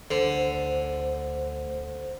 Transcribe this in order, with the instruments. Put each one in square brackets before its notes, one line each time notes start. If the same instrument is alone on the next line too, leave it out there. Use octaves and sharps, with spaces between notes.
[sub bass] D2 [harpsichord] D3 [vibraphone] C5